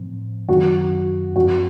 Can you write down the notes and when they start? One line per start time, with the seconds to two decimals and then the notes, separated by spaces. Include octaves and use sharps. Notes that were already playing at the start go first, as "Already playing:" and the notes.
Already playing: A2 F3 C4
0.48 F#2 D#3 F#3 C4 F#4
1.36 F#2 F3 C4 F#4